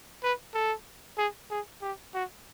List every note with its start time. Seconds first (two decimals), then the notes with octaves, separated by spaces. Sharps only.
0.23 B4
0.54 A4
1.18 G#4
1.51 G#4
1.82 G4
2.14 F#4